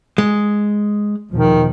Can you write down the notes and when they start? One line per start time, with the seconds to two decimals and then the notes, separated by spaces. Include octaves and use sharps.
0.18 G#3
1.32 E2 B2 D#3 F3